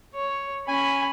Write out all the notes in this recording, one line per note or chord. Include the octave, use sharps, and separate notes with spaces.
C#5
C#4 G#5 B5